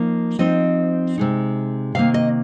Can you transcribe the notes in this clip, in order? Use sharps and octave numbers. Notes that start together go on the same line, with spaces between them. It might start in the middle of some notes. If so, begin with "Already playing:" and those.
Already playing: F3 A#3 D#4
F3 C4 D#4 D#5
C3 G#3 D#4
C3 D#3 A#3 F5
D#5